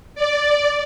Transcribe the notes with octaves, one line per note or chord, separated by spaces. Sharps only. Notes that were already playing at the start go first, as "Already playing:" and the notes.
D5